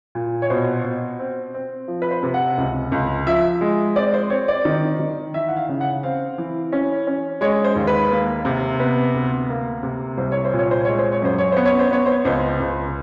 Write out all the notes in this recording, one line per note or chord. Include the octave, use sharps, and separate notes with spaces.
A#2
C#5
B2 C5
B2
C4
C4
F3
B4
C5
C3
F#5
C#2
C#2
F3 E5
G#3
C4 D5
C5
C4 C#5
D5
D#3
D#3
E3 E5
F#5
F5
C#3
F#5
C4 F5
E3
C#4
C#4
G#3 C#5
C5
D#2
B4
A#3
C3
B3 B4
D2
A#3
C3
C2 C5
C#5
C5
A#2
C#5
C5
G#3 C#5
C5
C#5
F#2 C5
C#5
B3 C5
C#5
C5
B3 C#5
C5
C#2 C5
C#2